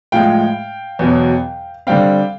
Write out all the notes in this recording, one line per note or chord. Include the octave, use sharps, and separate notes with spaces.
A2 F3 G#3 F5 G5
E2 B2 F#3
D3 G3 C4 F5 G5